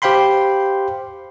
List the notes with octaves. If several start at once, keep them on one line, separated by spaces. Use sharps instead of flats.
G4 C5 F5 G5 B5 C6